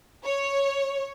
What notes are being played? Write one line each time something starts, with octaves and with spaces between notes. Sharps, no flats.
C#5